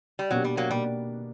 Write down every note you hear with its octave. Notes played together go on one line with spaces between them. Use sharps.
G3
B2 F#3 A#3 D4 G4
G3
F#3 A#3
B2 G3 A#3